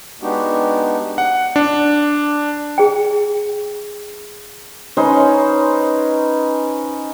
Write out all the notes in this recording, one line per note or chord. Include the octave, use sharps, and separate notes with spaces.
G#3 B3 D4 D#4 F#4 G4
F#5
D4
G#4 G5
C#4 D#4 B4 C5